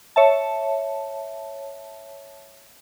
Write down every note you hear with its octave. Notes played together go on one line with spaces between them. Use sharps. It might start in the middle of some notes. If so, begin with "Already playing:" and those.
C#5 E5 A5